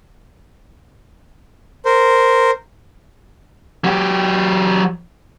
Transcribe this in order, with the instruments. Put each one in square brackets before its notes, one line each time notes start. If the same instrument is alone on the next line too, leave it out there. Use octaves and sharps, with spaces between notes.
[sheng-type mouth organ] A#4 C5
[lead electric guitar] F#3 G4